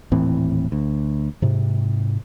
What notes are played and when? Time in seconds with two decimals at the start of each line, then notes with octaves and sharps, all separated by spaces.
0.12 D#1 A2 E3 C4
0.72 D2
1.42 G#2 C3